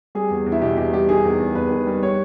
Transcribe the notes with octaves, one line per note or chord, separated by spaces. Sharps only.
G3 G#4
E2
E2
E4
B2 G4
E2 G4
G3 G4
D#3 G#4
E2
E2
E2 B4
D#3
G3
G3 C#5